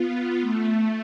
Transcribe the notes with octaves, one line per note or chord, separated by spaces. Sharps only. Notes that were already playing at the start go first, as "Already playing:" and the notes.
Already playing: B3 F4
A3